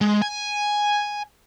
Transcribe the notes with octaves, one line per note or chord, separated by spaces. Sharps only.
G#3
G#5